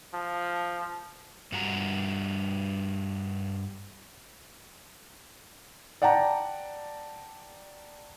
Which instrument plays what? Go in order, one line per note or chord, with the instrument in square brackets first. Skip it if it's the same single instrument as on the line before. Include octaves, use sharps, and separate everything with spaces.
[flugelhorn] F3
[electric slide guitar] G2 G3 F#4 A5 A#5
[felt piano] D5 F#5 G5 A5 A#5